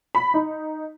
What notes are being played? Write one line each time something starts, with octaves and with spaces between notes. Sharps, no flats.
B5
D#4